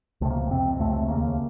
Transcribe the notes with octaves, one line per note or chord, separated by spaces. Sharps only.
C#2 C3 A3
A#3
A#3
F2 C3 C4
C#2 C3 A3
A3
D#2 C#3 A#3